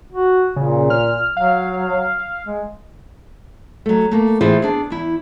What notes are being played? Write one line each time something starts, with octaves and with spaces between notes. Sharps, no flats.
F#4
A#2 C#3
F6
F#3 F5
G#3
F#3 A3
A3 A#3
A2 E3 F4 G#4 C5 E5
B3 D4 G#4
E2 E4